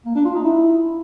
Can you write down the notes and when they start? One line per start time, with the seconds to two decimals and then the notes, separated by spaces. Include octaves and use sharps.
0.06 A#3
0.16 D4
0.25 F4
0.35 D#4
0.45 E4